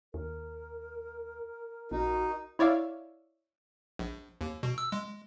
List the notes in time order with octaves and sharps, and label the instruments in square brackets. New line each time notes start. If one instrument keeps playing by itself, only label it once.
[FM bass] D#2 [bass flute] A#4
[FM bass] A#1 [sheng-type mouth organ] D#4 [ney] F#4
[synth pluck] E4 C#5 D5 E5 F5
[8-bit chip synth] A#1
D#2
B2
E6
G#3